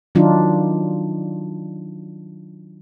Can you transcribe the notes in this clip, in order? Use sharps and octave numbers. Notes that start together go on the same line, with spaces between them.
D#3 F#3 D4 D#4 F4